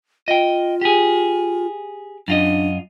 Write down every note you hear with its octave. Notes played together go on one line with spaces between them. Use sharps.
F4 D#5 G5
G4 G#4
F#2 D4 F4 D#5